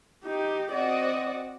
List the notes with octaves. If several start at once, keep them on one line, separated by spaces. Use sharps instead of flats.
D#4 G4
C4 F#4 D5 D#5 F#5